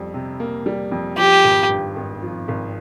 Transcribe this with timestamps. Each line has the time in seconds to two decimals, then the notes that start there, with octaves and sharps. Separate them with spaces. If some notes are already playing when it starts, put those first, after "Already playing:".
Already playing: F2 G3
0.14 C3
0.40 A#3
0.66 G3
0.92 F2
1.18 F3 G4
1.44 G#1
1.70 G2
1.96 G#1
2.22 F3
2.48 G#1